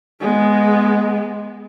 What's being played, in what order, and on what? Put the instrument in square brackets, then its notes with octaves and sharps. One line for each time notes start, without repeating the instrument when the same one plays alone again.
[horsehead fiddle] G#3 B3